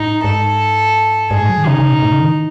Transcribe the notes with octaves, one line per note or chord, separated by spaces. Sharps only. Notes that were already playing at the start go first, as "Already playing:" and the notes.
Already playing: A2 D#4
G#2 A4
G#2 G#4
A2
F#3
D#3
C#3 D#4
C#3
B2
A2
C#3
D#3
E3